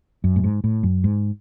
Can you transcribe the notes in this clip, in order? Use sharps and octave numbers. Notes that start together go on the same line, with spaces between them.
F#2
A2
G#2
A2
F#2
G#2